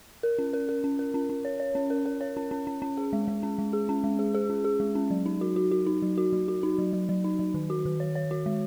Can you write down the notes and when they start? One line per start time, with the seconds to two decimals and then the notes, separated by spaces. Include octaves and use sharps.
0.23 A#4
0.39 C#4
0.53 A#4
0.69 A#4
0.84 C#4
0.99 A#4
1.14 C#4
1.30 C#4
1.45 C#5
1.60 C#5
1.75 C#4
1.90 A#4
2.06 A#4
2.21 C#5
2.37 C#4
2.51 C#4
2.67 C#4
2.82 C#4
2.97 G#4
3.13 G#3
3.28 G#3
3.43 C#4
3.59 G#3
3.73 G#4
3.89 C#4
4.04 G#3
4.19 G#4
4.35 G#4
4.50 C#4
4.65 G#4
4.80 G#3
4.95 C#4
5.10 F#3
5.26 D#4
5.41 F#4
5.56 F#4
5.71 F#4
5.86 D#4
6.02 F#3
6.18 F#4
6.33 F#3
6.48 F#4
6.63 D#4
6.78 F#3
6.93 F#3
7.09 F#3
7.24 D#4
7.39 F#3
7.54 D#3
7.70 F#4
7.85 D#3
8.00 C#5
8.15 C#5
8.31 F#4
8.46 G#3